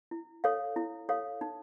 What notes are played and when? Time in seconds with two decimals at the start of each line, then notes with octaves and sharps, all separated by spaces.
0.11 E4
0.44 A4 C#5 F5
0.76 E4
1.09 A4 C#5 F5
1.41 D#4